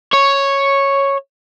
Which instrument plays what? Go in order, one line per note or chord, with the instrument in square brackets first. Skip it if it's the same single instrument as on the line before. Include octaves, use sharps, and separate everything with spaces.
[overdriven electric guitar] C#5